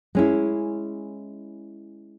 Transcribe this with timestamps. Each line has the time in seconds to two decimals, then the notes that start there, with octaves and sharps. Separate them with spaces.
0.15 G#3 C#4 E4